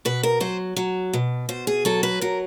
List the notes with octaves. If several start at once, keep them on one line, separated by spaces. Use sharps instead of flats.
B2 B4
A#4
F#3 C5
F#3
B2
B2 C5
G#4
F#3 A4
B4
F#3 A#4